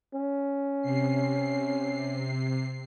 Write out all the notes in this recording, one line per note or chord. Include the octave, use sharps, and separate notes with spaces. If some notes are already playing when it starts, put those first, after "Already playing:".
C#4
C3 C7